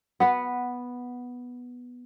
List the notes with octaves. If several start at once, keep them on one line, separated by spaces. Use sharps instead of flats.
B3 B4 F#5